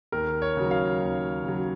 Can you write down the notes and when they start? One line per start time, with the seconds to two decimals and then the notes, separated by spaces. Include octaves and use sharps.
0.12 D#2 A#4
0.42 C#5
0.57 C#3 F#3
0.71 F5
1.01 D#2
1.44 C#3 F#3